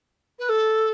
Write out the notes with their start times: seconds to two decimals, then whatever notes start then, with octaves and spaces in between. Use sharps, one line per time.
0.39 B4
0.49 A4